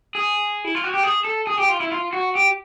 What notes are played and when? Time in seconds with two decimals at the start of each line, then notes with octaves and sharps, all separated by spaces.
0.15 G#4
0.64 E4
0.75 F4
0.84 F#4
0.94 G4
1.03 G#4
1.25 A4
1.47 G#4
1.58 G4
1.69 F4
1.80 E4
1.92 F4
2.13 F#4
2.35 G4